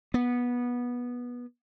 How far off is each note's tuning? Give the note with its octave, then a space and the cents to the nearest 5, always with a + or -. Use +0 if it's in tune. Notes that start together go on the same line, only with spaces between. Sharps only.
B3 -15